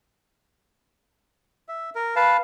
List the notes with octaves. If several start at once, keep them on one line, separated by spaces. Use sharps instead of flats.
E5
A#4
B4 F5 A5